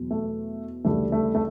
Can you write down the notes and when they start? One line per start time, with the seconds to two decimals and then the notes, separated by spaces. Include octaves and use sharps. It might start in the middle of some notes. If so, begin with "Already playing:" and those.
Already playing: E2 B2 F#3
0.11 A3
0.84 D2 C#3 E3 G3 A3
1.12 A3
1.35 A3